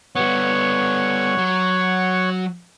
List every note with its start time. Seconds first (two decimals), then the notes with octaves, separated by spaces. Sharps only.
0.16 G3 B3 C#5 F#5 C#6
1.39 F#3